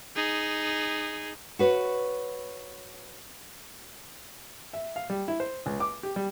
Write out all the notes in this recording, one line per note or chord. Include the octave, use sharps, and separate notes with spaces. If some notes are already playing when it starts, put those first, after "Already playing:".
D#4 G#4
F#4 B4 C#5
E5
F5
G3
E4
C5
C#2
D6
G4
G3